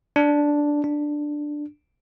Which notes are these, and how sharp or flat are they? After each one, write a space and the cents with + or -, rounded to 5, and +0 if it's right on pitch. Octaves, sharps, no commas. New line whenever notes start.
D4 -5
D4 +5